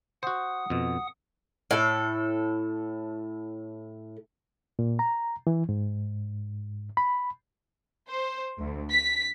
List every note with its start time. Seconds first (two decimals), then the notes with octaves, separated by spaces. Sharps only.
0.23 F#4 C5 F#5 D#6
0.70 F2 B2
1.71 A2 A4
4.79 A#2
4.99 A#5
5.47 E3
5.69 G#2
6.97 B5
8.09 C5
8.58 D2
8.91 B6